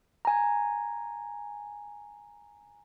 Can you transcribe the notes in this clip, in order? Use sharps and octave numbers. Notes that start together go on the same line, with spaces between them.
G#5 A#5